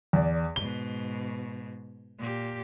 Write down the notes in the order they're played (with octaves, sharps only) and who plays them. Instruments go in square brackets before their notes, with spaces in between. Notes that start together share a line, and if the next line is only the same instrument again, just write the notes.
[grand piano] E2 D5
[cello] G#2 B2 [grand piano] G7
[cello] A#2 G4